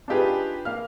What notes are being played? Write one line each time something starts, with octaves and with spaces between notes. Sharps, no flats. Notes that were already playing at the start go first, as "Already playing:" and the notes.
D4 D#4 F4 G4 G#4 B4
A#3 F5 F6